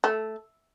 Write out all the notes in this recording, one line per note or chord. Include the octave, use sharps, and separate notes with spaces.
A3